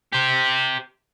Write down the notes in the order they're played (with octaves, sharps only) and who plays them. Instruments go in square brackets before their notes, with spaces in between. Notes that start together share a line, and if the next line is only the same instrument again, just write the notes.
[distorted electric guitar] G4 C5